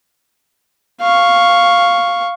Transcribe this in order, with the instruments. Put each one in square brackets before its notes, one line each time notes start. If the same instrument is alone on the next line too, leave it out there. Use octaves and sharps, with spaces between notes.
[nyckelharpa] F5 C#6